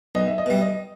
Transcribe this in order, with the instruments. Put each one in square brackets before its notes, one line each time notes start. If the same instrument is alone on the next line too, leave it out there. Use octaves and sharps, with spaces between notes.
[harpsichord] B1 [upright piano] D#5
[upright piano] E5
D#5
[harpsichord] B2 G3 [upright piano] E5
[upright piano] D#5